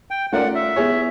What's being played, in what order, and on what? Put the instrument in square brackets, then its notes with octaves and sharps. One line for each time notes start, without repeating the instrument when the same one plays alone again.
[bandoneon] G5
[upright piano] A3 C#4 F4 A#4 D5 [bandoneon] F#5
[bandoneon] E5
[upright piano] B3 E4 G#4 C#5